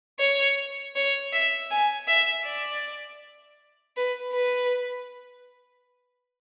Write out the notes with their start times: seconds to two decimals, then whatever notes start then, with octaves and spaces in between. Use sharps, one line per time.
0.19 C#5
0.96 C#5
1.33 E5
1.71 G#5
2.07 E5
2.45 D5
3.97 B4
4.34 B4